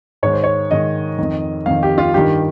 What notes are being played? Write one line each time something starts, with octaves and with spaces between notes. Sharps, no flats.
G#2 D#3 C#5
C5
C#5
G#2 D#3 D#5
F2 D#3
F2 D#3 F5
G4
F4
G2 D#3 G4